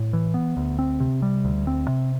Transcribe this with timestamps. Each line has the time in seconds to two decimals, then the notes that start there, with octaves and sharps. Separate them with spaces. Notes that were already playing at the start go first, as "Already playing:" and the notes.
Already playing: A2
0.13 E3
0.34 B3
0.57 D2
0.79 C4
1.00 C3
1.22 G3
1.45 D2
1.67 C4
1.88 C3